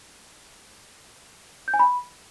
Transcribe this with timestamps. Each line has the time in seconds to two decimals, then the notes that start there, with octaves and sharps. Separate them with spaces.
1.68 G6
1.74 G#5
1.79 B5